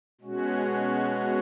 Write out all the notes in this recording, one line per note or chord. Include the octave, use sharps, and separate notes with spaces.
B2 G#3 C#4 F#4